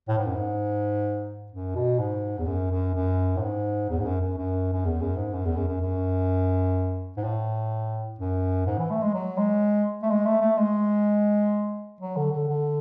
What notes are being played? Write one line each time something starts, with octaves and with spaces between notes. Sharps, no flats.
A2
G#2
F#2
G#2
F#2
B2
G#2
E2
F#2
F#2
F#2
A2
G#2
E2
G#2
F#2
F#2
F#2
F#2
E2
F#2
G#2
F#2
E2
F#2
F#2
F#2
G#2
A2
F#2
G#2
E3
A3
G#3
F#3
G#3
A3
G#3
A3
A3
G#3
F#3
D3
D3
D3